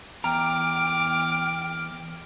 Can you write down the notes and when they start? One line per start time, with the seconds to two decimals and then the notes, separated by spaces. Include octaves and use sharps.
0.24 E2 G5 A#5 D6 F6